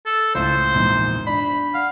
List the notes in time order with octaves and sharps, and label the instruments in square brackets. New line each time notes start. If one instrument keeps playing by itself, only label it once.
[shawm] A4
[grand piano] C#2 A2 [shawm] C5
[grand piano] A#1 E2 G#2
[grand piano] D4 [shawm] B5
[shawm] F5 [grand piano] F#5